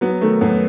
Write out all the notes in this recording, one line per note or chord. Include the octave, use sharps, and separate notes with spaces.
F#3 B3
D#3 A3
F#2 B3